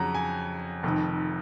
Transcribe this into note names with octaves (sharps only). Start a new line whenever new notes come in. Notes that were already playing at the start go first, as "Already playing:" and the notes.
Already playing: F2 C#3 F#3 F#5 A#5
G#5
F1 F2 D#3